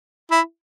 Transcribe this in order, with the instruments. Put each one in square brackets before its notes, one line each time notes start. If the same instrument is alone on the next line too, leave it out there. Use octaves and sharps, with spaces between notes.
[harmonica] E4